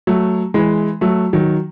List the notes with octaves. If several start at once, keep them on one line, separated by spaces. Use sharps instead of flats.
F#3 A3
E3 G#3
F#3 A3
D#3 F#3